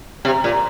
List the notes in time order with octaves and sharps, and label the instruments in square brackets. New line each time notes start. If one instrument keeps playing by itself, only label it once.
[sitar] C3
A#2